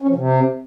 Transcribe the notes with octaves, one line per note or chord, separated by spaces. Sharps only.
C#4
F3
C3